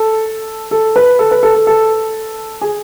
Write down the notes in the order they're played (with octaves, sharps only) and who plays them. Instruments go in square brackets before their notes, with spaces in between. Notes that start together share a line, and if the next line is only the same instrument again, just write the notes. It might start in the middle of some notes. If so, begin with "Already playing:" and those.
Already playing: [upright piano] A4
A4
B4
A4
B4
A4
A4
A4
G#4